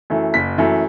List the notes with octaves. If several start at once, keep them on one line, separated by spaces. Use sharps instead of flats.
F#2 E3 A3
F#1 B6
F#2 E3 A3